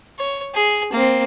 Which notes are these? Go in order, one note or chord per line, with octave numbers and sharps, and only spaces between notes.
C#5
G#4
A#3 C4